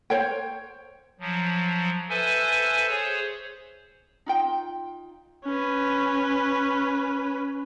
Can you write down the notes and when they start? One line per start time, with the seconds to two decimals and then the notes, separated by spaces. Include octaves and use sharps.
0.10 C5 C#5 G5
1.20 F3 F#3
2.09 A4 B4 C5 E5 G#5
2.89 G#4 C5 C#5
4.26 D#4 F4 G5
5.45 C#4 B4